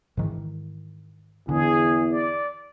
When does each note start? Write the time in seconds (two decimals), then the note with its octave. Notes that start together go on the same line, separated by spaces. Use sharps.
0.17 G#2 D#3 E3
1.49 E2 D3 G#4
2.10 D5